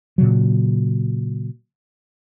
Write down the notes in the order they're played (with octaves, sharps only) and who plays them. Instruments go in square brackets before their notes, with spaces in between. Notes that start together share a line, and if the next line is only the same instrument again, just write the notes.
[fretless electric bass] A#2 C#3 F#3